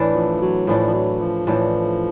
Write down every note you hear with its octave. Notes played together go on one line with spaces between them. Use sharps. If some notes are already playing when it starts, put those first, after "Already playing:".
Already playing: A2 E3 A3 D4
F3
F#3
A2 E3 F3 A3 D4
F3
F#3
F3
A2 E3 A3 D4